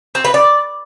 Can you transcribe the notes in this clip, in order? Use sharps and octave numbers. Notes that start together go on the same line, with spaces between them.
C4
B4
D5